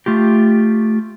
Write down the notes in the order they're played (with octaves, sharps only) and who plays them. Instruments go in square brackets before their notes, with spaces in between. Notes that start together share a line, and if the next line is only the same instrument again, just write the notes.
[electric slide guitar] A3 F4 G4